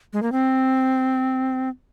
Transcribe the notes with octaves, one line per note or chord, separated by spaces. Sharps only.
G#3
A#3
C4